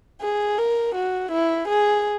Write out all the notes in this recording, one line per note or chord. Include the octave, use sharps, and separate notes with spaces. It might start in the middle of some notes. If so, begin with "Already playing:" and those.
G#4
A#4
F#4
E4
G#4